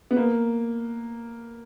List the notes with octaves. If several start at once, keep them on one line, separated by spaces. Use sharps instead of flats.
B3
A#3